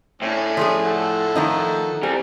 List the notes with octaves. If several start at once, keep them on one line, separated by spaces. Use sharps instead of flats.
A2 C#4 D4
F3 A3 G#4
A4 F#5
D#3 F3 D#4
G3 C4 G#5